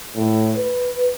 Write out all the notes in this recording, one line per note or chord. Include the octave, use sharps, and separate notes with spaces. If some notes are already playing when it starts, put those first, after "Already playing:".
A2
B4